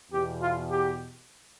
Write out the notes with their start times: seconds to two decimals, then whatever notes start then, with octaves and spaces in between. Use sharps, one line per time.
0.11 E2 B2 G4
0.40 F4
0.69 G4